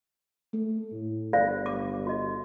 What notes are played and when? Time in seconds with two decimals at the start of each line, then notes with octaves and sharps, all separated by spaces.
0.53 A3
0.92 A2
1.33 G1 C5 D5 F5
1.66 D6
2.07 F#4 D#5